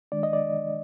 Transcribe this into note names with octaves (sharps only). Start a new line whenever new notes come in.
D#3 G#3 D4 D5
D#5
D5